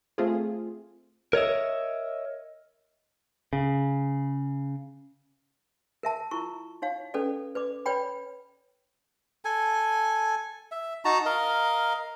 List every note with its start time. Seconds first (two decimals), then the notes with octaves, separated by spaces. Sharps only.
0.18 A3 C4 F4 G#4
1.33 A#4 C#5 D#5 E5
3.53 C#3
6.03 A#4 E5 A5
6.31 E4 F4 A#4 C#6
6.82 D#4 C#5 F5
7.14 C#4 A4 B4 D5
7.55 B4 D5 D6
7.86 B4 C#5 D5 G5 B5
9.45 A4 G#5
10.71 E5
11.05 D#4 F#4 A5 A#5
11.26 A#4 D#5 F5